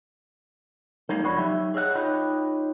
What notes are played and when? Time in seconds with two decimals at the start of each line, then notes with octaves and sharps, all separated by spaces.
1.09 G3 G#3 A#3 D#4 A4
1.23 F2 F3 D4 F#4 C#5 B5
1.36 F#3 D#4 G4 E5
1.74 G#4 C#5 D#5 E5 F#5
1.95 D#4 F4 G4 B4 C#5 D#5